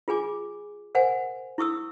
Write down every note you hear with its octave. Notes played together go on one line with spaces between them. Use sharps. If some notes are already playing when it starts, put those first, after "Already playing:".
F4 G#4 G#5 D6
A#4 C5 F#5 G#5
E4 C#6 D#6 E6